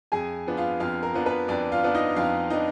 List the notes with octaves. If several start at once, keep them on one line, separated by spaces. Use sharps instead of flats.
F2 G#4 G#5
F3 B3 D4
F4 F5
F2 F4 F5
A#4
F3 B3 D4
B4
F2 D4 D5
F4 F5
F3 B3 D4
D#4 D#5
F2 F4 F5
F3 B3 D4 D#4 D#5